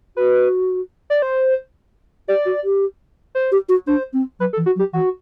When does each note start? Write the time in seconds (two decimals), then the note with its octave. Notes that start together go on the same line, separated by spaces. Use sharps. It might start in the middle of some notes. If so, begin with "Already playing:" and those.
0.17 F#4 B4
1.10 D5
1.22 C5
2.28 G4 D5
2.46 F#4
2.64 G4
3.35 C5
3.52 G4
3.69 F#4
3.87 D4 C5
4.13 C4
4.40 F#3 B4
4.53 A4
4.57 E3
4.66 F#4
4.76 F#3
4.79 G4
4.93 E3 F#4